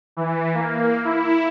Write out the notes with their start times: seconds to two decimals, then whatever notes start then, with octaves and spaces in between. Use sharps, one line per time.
0.17 E3
0.54 A#3
1.04 E4